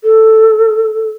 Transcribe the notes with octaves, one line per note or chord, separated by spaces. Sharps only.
A4